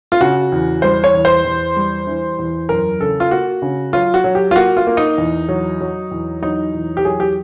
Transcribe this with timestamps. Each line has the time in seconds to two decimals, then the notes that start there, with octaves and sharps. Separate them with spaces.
0.12 F4
0.21 C#3 F#4
0.52 E2
0.82 G3 C5
1.04 C#5
1.14 E2
1.25 C5
1.44 E2
1.76 G3
2.07 E3
2.39 E2
2.69 F#2 A#4
3.00 C#3 A4
3.20 F4
3.31 A#3 F#4
3.62 C#3
3.93 F#3 F4
4.14 F#4
4.24 F#3
4.35 G4
4.51 F4
4.56 A#3 F#4
4.77 F4
4.87 A#3
4.97 D#4
5.18 E2
5.49 F#3
5.81 F#3
6.11 E2
6.42 F#3 D#4
6.74 E2
6.97 G4
7.05 F#3 G#4
7.20 G4